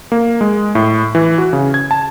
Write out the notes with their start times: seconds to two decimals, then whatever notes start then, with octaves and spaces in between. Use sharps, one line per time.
0.12 A#3
0.41 G#3
0.75 A2
1.15 E3
1.38 F#4
1.53 C#3
1.74 G#6
1.91 A5